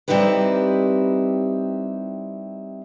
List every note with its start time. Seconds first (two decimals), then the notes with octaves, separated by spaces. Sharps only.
0.08 G3 C4 D#4 E4 G4 B4